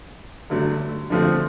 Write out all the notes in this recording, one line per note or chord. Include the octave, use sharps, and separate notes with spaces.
G2 D3 F#3 A3
D3 F3 A3 C4